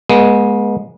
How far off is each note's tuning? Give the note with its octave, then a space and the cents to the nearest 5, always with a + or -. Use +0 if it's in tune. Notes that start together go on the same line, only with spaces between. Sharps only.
G#3 +0 B3 -35